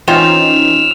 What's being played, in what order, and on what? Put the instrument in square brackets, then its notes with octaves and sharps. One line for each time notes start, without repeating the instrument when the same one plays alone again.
[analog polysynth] E3 C#4 D#4 [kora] C4 [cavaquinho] F4 [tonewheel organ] E6 F6